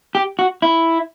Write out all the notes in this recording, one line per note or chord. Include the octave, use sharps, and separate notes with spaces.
G4
F#4
E4